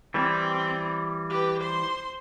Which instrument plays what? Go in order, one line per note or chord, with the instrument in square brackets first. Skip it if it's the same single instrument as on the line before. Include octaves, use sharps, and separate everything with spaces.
[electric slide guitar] E3 G3 [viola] C4
[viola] G4 B4
C5 C6